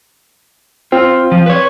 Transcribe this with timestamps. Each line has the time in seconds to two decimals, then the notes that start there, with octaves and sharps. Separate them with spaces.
0.92 C4 F4
1.32 F3
1.46 B4 C#5